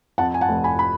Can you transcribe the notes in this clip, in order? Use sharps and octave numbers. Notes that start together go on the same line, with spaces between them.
F2 F#5 A5
G#5
F#5 A5
F1
G#5 B5
B5